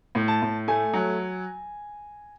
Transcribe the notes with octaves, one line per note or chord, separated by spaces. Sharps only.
A2
A5
A2
A3 G#5
F#3